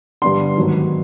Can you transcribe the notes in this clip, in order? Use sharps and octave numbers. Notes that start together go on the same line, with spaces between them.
G2 D3 G3 B3 D4 C6
G#2 D#3 F#3 B3